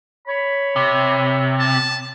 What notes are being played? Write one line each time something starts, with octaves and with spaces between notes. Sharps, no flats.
C#5 B5
C3
A5